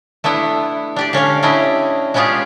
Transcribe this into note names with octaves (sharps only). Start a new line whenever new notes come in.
A3 B3 D4 E4
D4 G4 D5
D3 C#4 C#5 F5
C#4 D4 E4 G4 D#5
G#3 B3 C#4 F4 G4 G#4